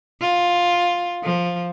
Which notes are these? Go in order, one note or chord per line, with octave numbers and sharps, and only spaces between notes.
F4
F3